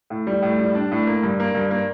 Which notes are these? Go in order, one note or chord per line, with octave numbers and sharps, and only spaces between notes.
A2
G3
A2
G3
D4
A2
A#3
G2
A#3
G2
A#3